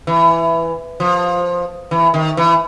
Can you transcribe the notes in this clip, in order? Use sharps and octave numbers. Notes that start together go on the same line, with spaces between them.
E3
F3
E3
D#3
E3